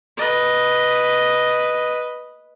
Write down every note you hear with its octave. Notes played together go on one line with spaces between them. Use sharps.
B4 D#5